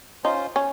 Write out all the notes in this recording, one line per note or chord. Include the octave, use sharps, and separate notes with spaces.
C#4 D#4 F4 C5
C#4